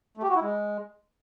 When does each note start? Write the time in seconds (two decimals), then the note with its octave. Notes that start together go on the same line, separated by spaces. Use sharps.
0.17 A3
0.23 G4
0.29 F#4
0.35 E4
0.41 G#3